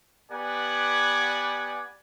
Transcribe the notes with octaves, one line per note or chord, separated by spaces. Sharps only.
B3 G4 B4 D5 F#5 G#5